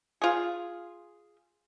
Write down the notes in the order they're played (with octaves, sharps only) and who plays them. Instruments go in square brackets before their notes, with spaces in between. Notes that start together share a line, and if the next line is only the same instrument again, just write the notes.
[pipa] F4 G#4